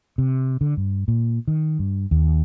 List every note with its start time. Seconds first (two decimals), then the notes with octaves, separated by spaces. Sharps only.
0.18 C3
0.61 D3
0.77 G2
1.08 A#2
1.47 D#3
1.79 G2
2.11 D#2